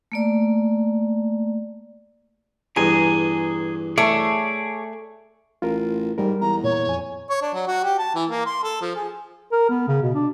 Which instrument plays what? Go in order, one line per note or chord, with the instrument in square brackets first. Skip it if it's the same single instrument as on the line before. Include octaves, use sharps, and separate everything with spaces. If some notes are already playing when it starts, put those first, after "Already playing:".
[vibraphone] A3 A#3 D5
[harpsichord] E2 G2 [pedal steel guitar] G#4 G#5 A#5
[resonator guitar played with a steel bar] A3 [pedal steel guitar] G#4 C#5 D5
[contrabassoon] A1 [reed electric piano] F4 A#4
[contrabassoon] G#2 [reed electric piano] G3 A#4
[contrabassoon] E2 [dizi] A#5
[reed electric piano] A#2 [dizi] C#5
[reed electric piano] F2 G#5
[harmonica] C#5
D4
F#3
F#4
G4
A5
E3
A#3
C6
A4
F3
G#4
[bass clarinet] A#4
B3
C#3
B2
D4